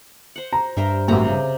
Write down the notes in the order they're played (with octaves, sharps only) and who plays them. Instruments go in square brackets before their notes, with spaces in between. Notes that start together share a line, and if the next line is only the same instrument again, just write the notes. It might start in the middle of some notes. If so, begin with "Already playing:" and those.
[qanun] C5 F#5
[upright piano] A#5
[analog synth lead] G2 [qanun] A#4 C5 E5
[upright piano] A1 F#2 A2 [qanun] C3 G4 A#5
[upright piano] C#3